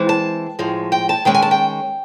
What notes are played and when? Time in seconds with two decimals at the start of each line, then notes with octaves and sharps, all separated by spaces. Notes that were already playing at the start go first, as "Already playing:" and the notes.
Already playing: E3 G#3 C4
0.09 A5
0.59 A2 F3 G#3
0.92 G5
1.09 A5
1.25 D#3 G#3 C#4 G5
1.35 G#5
1.42 A5
1.51 G5